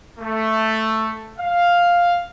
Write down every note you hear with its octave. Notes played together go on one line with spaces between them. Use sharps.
A3
F5